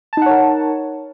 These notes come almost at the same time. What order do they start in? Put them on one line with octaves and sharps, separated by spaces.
A5 D#4 F#5 C#5 A#4